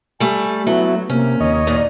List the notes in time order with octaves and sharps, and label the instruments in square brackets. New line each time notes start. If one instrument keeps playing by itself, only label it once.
[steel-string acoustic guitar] G3 A3 [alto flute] G#5
[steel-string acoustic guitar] F#3 [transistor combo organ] A3 B3 E4 [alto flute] F#4
[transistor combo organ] C3 [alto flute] A#3 [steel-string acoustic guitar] C#4
[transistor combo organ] D#2 C#5 D#5
[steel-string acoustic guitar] D2 A#2 D#4 [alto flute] D5